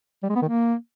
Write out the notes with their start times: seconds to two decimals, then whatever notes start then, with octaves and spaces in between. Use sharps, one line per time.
0.23 G3
0.30 G#3
0.36 B3
0.42 D#3
0.49 A#3